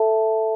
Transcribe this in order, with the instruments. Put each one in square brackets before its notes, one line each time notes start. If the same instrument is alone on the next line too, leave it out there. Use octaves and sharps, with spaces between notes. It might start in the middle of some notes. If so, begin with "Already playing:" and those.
Already playing: [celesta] A4 E5 A5